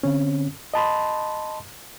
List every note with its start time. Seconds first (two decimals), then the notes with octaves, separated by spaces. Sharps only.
0.03 D3 C4 C#4
0.74 D#5 A5 B5 C6